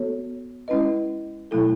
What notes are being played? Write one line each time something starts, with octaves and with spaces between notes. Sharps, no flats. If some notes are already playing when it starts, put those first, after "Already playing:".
Already playing: B3 F#4 A4 C#5
G#3 C#4 E4 B4 D#5
B2 F#3 A3 E4 A4